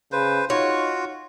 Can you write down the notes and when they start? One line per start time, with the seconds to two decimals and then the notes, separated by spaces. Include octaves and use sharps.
0.12 C#3 B4 C5
0.50 D#4 F4 F#4 C#5